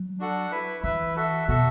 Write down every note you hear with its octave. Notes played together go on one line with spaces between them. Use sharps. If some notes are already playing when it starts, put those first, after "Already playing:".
Already playing: F#3
D4 F#4 A4 F#5
E4 B4 E5
E3 E4 B4 E5
F#4 A4 E5
B2 F#4 A4 E5